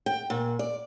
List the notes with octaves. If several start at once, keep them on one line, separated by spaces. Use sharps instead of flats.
G5
A#2
D5